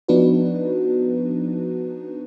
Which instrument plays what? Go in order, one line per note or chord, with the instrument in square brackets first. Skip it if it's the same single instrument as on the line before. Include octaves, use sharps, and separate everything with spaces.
[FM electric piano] F3 B3 D4 D#4 F#4 B4